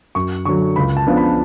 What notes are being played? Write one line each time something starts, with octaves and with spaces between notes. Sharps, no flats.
F#2 C#6
D3 F#3 C#6
C#2 B5
A5
C#3 F3 B3 D4
B5